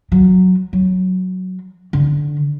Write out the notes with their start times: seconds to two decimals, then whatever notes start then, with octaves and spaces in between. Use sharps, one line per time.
0.12 F#3
0.73 F#3
1.93 D3